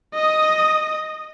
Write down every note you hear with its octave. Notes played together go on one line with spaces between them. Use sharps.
D#5 D#6